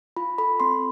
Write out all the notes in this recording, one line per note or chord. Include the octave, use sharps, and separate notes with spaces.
F4 B5
A4 B5
C4 C6